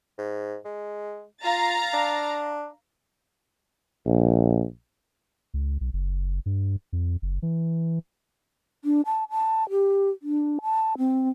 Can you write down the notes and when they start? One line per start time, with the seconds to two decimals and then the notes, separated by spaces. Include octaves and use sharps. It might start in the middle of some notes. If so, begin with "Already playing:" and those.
0.18 G#2
0.65 G#3
1.44 F4 F5 A#5 A6
1.93 D4
4.06 A#1
5.54 C#2
5.81 B1
5.93 F#1
6.46 G2
6.93 F2
7.22 F#1
7.42 E3
8.85 D4
9.06 A5
9.31 A5
9.71 G4
10.23 D4
10.62 A5
10.98 C4